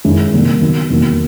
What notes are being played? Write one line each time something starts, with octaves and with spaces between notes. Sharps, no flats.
F#2 D#3 G#3 C#4 E4
C3 D#3 G3 A#3
D#3 F#3 B3
E2 C3 D#3 F#3 A#3